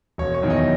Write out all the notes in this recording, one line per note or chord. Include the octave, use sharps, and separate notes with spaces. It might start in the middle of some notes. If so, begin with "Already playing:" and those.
E1 C#5
C#5
E2 D#3 F#3
D#5